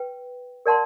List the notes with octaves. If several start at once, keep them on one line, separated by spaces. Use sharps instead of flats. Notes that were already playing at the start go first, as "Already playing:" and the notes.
Already playing: B4 G5
A#4 D5 F#5 A5 C6